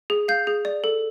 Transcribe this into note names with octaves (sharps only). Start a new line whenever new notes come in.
G#4
F5 G6
G#4
D5
A4